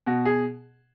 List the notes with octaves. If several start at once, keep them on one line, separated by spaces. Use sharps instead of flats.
B2 F#4
G#4